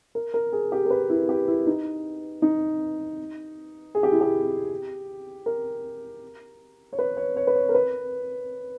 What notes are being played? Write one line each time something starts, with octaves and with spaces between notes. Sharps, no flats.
A#4
A#4
G#4
G4
A#4
B4
E4
G4
E4
D#4
D#4
G#4
G4
E4
G4
A#4
C#5
B4
C#5
C#5
B4
C#5
A#4
B4